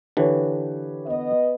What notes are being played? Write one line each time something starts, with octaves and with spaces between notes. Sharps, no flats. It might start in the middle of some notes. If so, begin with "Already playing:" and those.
D3 E3 G4 B4 C#5
B3 D#5